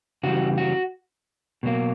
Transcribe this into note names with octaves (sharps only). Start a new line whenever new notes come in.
C#3 E3 G3 F#4
F#4
B2 F#3 A#3